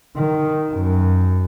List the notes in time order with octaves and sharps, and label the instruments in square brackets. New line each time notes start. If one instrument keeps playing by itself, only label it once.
[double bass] D#3
F#2